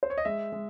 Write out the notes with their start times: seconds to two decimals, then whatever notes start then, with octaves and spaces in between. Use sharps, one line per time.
0.03 C5
0.10 C#5
0.18 D#5
0.25 G#3 E5
0.52 G#3